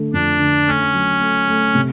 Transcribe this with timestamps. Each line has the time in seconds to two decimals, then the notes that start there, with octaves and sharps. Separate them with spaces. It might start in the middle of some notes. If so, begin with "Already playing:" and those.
Already playing: D3 A3
0.13 F2 D4
0.40 D3
0.67 A3 C#4
0.94 F#3
1.21 A3
1.48 A3
1.75 C3